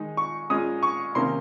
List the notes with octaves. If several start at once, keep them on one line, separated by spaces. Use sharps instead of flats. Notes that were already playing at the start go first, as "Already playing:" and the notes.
Already playing: D#3 G#3 D#4
C#6
A#2 G#3 C#4 D#6
C#6
C3 D#3 A#3 C#4 C6